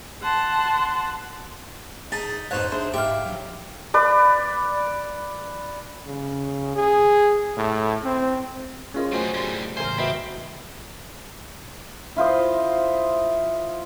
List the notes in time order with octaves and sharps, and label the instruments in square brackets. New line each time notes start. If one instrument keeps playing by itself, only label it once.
[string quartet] F#5 A5 C6
[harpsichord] D#4 [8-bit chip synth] G#4 A6 B6 [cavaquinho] A5
[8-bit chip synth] F2 G#2 [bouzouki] B2 C5 F#5 [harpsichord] D#4 C#5
[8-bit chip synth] D4 G#4 [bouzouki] E4 [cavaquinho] C5
[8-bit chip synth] G#2 [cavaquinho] G4 F5 [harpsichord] E5
[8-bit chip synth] A#1 F#3
[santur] B4 D5
[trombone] C#3
G#4
A2
C4
[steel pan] C#4 F4 D#5 [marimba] G#4 A#4
[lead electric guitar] B2 G#4 [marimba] F#3 A3 [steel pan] F#4 C5 D#5
[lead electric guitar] A2 G3 [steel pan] G#5 C6
[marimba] A2 C#3 E3 [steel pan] A#4 G#5 [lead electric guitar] C5
[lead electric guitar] C4 [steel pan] F#4 D#5 B5 [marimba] B4 E5
[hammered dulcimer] E4 F4 C5 D#5